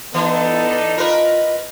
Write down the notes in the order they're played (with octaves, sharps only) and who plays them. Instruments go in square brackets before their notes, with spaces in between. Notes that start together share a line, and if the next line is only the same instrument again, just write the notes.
[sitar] E3 [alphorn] B3 [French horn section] D4 D#4 A4
[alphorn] F4 [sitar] A#4 B4 [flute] D#5